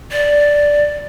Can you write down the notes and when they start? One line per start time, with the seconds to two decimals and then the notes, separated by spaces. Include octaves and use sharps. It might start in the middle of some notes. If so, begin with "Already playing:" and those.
0.12 D5